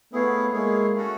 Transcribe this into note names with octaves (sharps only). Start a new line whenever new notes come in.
A3 B3 E4 G#4 C#5 F5
G#3 A#3 E4 G#4 C#5 F5
A3 C#4 F#4 A4